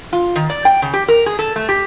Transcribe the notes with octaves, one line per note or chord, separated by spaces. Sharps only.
F4
D#3
D5
G5
C#3
G4
A#4
G#4
A4
A3
G4